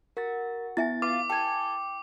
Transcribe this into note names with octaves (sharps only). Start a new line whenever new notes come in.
F#4 A#4 A6
B3 E4 E5 G#5 A6
F4 B4 D6
A4 G5 G#5